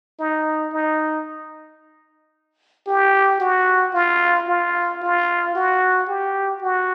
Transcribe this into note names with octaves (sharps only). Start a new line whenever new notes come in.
D#4
D#4
G4
F#4
F4
F4
F4
F#4
G4
F#4